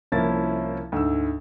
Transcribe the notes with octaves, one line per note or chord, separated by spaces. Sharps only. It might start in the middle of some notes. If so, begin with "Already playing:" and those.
C2 F3 A#3 C#4 E4 A6
D2 G#2 E6